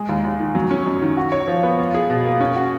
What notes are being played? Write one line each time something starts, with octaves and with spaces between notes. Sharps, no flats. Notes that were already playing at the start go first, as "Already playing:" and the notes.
Already playing: G#3
D#2
D#2
D#3
F#3
C#4
F#2
D#3
F#4
C#5
F3
B3
F4
G#4
B2
A#3
C#4
F#4